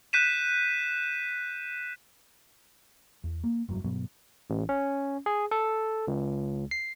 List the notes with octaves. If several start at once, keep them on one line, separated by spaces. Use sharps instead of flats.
F#6 G6 B6 D#7 E7
E2
A#3
F1 G2 F#3
G2 B2 F#3 B3
A1
C#4
G#4
A4
C#2
C7